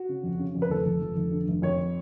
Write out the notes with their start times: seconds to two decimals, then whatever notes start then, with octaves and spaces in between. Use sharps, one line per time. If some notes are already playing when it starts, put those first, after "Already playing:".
Already playing: F#4
0.09 C#3
0.24 F2
0.39 C#3
0.55 F2
0.62 B4
0.70 F1 A4
0.86 F1
1.02 F1
1.16 F1
1.31 D3
1.48 F1
1.62 F2 C#5